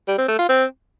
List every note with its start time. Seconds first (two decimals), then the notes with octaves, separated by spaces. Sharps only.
0.08 G3
0.18 C4
0.28 A3
0.39 F4
0.49 C4